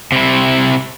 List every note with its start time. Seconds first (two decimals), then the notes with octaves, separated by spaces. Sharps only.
0.12 C3 E4